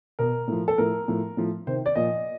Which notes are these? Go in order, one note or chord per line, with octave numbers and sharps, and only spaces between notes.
B2 A#4
A2 F3
A4
A2 F3 A#4
A2 F3
A2 F3
C3 D#3 C5
D5
A#2 F3 D#5